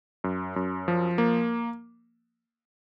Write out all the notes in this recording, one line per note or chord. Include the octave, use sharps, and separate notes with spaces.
F#2
F#2
F3
A#3